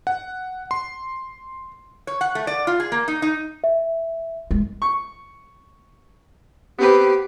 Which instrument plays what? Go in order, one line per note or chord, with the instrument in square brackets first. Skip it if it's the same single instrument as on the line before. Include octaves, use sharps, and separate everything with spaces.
[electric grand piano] F#5
C6
[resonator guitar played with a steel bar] C#5
F#5
A3
D5
F4
G#4
A#3
D#4
D#4
[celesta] E5
[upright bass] G#3
[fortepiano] C#6
[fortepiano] B3 C4 B4 [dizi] G4